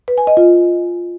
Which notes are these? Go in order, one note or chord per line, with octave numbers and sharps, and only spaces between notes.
B4
G#5
D#5
F4